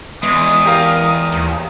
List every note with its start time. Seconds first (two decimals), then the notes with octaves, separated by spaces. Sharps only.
0.23 E2 G#3 D#6
0.66 G4 A#4 F5
1.32 D#2